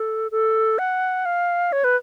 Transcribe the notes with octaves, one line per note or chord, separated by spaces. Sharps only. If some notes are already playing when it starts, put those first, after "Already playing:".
Already playing: A4
A4
F#5
F5
C#5
B4